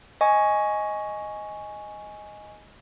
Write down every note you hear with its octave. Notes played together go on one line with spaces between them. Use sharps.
D#5 G#5 C#6